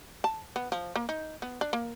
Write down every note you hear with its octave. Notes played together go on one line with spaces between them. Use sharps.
A5
B3
F3
A#3
D#4
B3
D4
A#3